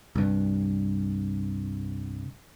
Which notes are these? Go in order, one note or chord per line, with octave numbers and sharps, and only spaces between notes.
C2 G2